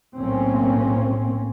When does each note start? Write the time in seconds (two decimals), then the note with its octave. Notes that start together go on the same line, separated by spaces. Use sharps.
0.16 B1 A2 A#3 C4 C#4